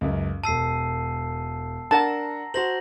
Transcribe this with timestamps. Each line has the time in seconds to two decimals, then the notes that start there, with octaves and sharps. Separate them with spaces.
0.01 C#2 F#2
0.44 E1 A5 E6 C7 D#7
1.91 D4 A#4 F#5 A5 A#5 A#6
2.54 F#4 C5 C6 A#6 F#7